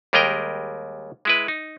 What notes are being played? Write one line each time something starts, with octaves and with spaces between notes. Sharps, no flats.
D#2 G3 G#3 A#4 D#5 G5
G#3 E4 B4
D#4